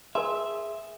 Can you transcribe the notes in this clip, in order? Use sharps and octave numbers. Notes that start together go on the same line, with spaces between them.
G#4 A#4 E5 A5 C6